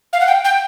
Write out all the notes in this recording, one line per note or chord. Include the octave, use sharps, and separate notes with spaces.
F5
F#5
G5
G5